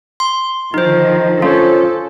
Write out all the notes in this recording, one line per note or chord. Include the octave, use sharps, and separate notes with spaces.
C6
D3 D#3 F3 D#4 C5
C#4 F4 A4 C5 C#5